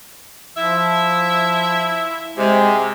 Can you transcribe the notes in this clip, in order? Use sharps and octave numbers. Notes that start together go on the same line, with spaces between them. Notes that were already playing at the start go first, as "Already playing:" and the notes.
F3 E4 E5
C3 G#3